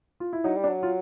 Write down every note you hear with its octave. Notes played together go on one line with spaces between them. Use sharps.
F4
E4
F#3 D#4
G3
D4
F#3
F4